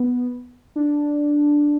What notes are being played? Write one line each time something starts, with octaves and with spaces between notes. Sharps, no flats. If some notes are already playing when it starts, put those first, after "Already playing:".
Already playing: B3
D4